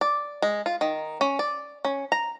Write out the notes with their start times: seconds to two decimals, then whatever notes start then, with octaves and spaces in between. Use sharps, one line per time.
0.01 D5
0.42 G#3
0.66 F4
0.81 D#3
1.21 C#4
1.39 D5
1.85 C#4
2.12 A#5